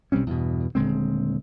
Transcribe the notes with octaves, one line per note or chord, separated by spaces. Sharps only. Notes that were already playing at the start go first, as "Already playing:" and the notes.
B1 G3 C4 C#4
E2 G2 B2
D#1 D3 G#3 C4